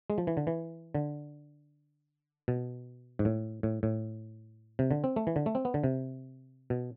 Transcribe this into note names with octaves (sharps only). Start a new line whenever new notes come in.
G#3
F3
E3
D3
E3
D3
B2
G#2
A2
A2
A2
C3
D3
C4
A3
E3
D3
A3
C4
B3
D3
C3
B2